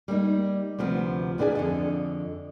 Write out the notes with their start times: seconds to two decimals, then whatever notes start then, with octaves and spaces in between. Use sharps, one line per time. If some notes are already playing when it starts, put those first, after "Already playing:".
0.08 G3 A#3 D4 D#4
0.79 D2 C3 F3 B3
1.38 E2 E3 B3 D4 G#4 G#5
1.55 F2 D3 D#5